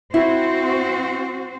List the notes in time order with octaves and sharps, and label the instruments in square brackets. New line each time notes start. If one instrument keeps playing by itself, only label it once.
[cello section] C4 F#4 C5 [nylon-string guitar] E4